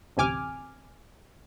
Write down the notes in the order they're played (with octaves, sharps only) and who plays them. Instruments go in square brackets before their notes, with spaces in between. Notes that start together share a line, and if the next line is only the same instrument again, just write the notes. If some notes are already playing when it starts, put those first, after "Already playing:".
[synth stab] A1 D2 C3 G#5 D6 F6